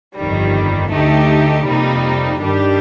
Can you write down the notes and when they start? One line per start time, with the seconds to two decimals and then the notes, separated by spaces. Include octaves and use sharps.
0.17 G1 F2 D#3 G3
0.91 D2 D3 A3 D#4 G4
1.65 F2 C3 G3 A#3 D#4
2.40 G2 D#3 G3 D4 G4